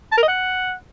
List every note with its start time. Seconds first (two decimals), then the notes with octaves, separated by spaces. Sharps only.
0.12 A5
0.17 A#4
0.23 D#5
0.28 F#5